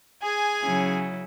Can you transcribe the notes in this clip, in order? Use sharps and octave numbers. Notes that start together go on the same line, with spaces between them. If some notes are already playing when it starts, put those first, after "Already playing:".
G#4 G#5
C#3 F#3 C#4 E4